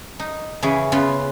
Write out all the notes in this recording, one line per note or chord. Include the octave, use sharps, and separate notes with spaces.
D#4
C#3 E3 C#4 G#4
C#3 B3 F4